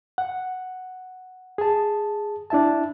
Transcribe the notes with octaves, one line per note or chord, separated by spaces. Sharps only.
F#5
G#4 A5
D4 E4 E5 A5